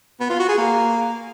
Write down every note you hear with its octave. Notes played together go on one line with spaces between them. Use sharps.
B3
F4
F#4
G#4
A#3